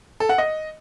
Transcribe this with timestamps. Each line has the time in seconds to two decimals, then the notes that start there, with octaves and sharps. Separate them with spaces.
0.20 A4
0.29 F#5
0.38 D#5